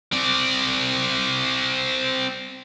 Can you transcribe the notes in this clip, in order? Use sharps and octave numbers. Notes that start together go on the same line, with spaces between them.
C4 D5